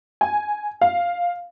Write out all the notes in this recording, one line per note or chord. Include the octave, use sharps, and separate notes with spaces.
G#5
F5